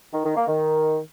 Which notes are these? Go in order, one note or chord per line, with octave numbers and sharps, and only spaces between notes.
D#3
D#3
A#3
D#3